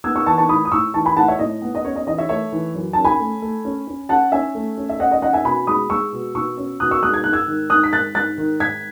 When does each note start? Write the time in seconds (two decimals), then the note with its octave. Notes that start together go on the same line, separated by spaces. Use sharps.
0.04 B3 E6 G#6
0.16 C#6 E6
0.26 E3 A5 C#6
0.38 A5 C#6
0.49 A2 B5 D#6
0.65 D#6
0.72 A2 C#6 E6
0.94 E3 A5 C#6
1.05 G#5 B5
1.17 A2 F#5 A5
1.28 C#5 E5
1.39 A2 D#5
1.62 B3
1.75 D#5
1.85 C#4 C#5
1.96 D#5
2.07 E3 D#5
2.18 C#5 E5
2.29 A3 C#5 E5
2.52 E3
2.75 F#2
2.93 C#4 A5
3.05 G#5 B5
3.19 A3
3.42 A3
3.65 C#4
3.87 C#4
4.09 C#4 F#5 A5
4.32 C#4 E5 G#5
4.55 A3
4.77 C#4
4.89 E5
5.00 C#4 D#5 F#5
5.11 D#5
5.22 C#4 D#5 F#5
5.33 E5 G#5
5.45 B2 G#5 B5
5.67 G#3 B5 D#6
5.90 G#3 C#6 E6
6.12 B2
6.35 B2 C#6 E6
6.57 C#4
6.80 B2 D#6 F#6
6.91 C#6 E6
7.02 G#3 D#6 F#6
7.14 G#6
7.24 G#2 F#6
7.33 E6 G#6
7.48 D#3
7.70 G#2 D#6 F#6
7.83 B6
7.93 G#2 F#6 A6
8.15 G#2 F#6 A6
8.38 D#3
8.60 G#2 G#6 B6